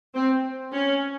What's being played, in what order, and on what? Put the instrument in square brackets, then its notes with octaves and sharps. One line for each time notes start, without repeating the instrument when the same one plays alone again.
[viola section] C4
C#4